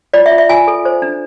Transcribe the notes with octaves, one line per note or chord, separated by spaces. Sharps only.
F4 D5
E5
F4
E5
F4 G#5
A4
C5
D4